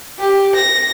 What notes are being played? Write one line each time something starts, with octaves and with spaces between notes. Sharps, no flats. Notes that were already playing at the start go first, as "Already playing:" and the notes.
G4
A#6